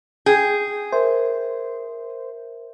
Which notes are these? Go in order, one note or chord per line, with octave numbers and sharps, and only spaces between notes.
G#4 G5
A#4 C5 E5